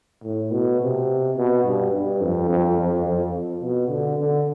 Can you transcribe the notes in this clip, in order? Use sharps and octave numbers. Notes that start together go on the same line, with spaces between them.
A2
B2
C3
B2
G2
G2
F2
F2
F2
F2
B2
D3
D3